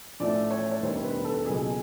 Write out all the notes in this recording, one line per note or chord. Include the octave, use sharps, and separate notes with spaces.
A1 A2 F3 A3 D5
C#5
C#5
E1 D#2 D#3 G3 B3 C5
B4
A4
C#2 B2 F#3 A#3 G#4